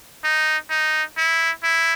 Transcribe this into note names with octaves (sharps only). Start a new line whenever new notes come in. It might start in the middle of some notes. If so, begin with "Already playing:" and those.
D#4
D#4
E4
E4